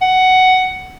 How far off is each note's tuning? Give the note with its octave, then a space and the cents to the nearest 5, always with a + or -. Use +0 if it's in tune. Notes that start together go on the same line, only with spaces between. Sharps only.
F#5 +10